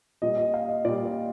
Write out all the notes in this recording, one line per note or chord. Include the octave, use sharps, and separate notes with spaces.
A#2 G3 D#5
D#5
F5
D#5
A#2 G3 D5
D5